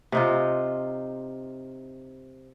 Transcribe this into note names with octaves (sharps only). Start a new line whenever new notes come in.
C3 D#4 F4